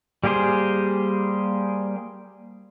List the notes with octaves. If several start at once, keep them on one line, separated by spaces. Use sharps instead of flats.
G3 A#3 G4 G#4 C5